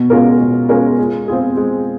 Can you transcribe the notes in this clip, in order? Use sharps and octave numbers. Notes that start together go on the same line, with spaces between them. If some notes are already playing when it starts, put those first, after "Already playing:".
Already playing: B2
G#3 C#4 F4 A#4
B2
G#3 C#4 F4 A#4
G#3
C4 F4 G#4
G#3